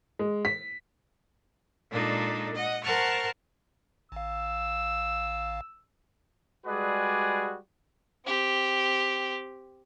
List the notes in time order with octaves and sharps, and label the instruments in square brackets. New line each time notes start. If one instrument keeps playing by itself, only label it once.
[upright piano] G#3
B6
[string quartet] A#2 G#3 D4 D#4 A4
D#5 F#5
A#4 C5 F#5 A5 C#6 F6
[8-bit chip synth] A1 F5 [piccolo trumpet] E6
[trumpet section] G3 G#3 F#4 G#4 B4 D5
[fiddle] C4 G4